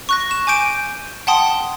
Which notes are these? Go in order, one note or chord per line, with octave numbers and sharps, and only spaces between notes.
C#6 F#6 A#6
E7
G#5 D6 G6 D7
F#5 G5 A5 C6 D#6